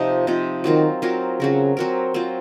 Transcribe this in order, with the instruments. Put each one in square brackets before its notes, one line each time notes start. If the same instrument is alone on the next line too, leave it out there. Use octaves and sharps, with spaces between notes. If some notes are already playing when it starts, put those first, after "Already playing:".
Already playing: [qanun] C3 F3 C4 D#4
C3 F3 C4 D#4
[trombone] D#3 [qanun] F#3 C4 F4 A#4
[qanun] F#3 C4 F4 A#4
[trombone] C#3 [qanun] F#3 C4 F#4 A#4
[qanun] F#3 C4 F#4 A#4
F#3 C4 F4